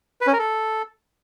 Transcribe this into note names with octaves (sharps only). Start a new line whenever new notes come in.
B4
C#4
A#4
A4